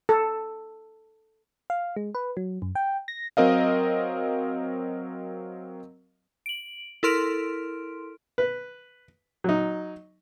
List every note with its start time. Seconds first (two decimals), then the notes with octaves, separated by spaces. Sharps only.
0.09 A4
1.70 F5
1.97 G#3
2.15 B4
2.37 F#3
2.62 F#2
2.75 G5
3.08 A#6
3.37 F#3 C4 A#4 D#5 F5
6.46 D7 F#7
7.03 E4 A4 A#4 C6 F6 D7
8.38 B4
9.44 F#3 D#4